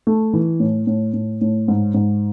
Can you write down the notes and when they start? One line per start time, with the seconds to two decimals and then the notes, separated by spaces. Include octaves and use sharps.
0.07 A3
0.33 E3
0.60 A2
0.87 A2
1.14 A2
1.41 A2
1.68 G#2
1.94 G#2